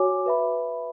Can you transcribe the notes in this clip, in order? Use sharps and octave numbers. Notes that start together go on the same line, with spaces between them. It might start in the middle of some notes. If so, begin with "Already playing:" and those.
Already playing: F#4 C#5 G#5 D6
B4 E5 B5